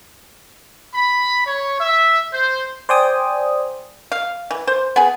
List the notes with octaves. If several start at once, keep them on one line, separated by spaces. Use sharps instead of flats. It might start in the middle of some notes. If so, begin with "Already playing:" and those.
B5
C#5
E5
C5
C5 D5 G5 G#5 D#6
F5
E3
C5
B3 G#4